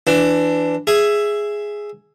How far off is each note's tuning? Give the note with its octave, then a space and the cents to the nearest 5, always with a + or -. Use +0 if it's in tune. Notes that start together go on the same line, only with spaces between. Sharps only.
E3 +20 D4 +0
G#4 +0 E5 +10